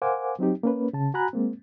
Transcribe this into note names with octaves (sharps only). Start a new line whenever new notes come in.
A#4 C5 F5 F#5 G#5 D6
F#3 C4 D#4 G4
A#3 C#4 B4
C#3 A5
F#4 G#5 A#5 B5 F#6
G#3 A#3 C4